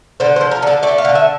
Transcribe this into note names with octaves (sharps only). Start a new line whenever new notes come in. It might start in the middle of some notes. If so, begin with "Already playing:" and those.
D3 C5
C5
F3
A#4
D3 A4
A3 D5
F5
D3
E5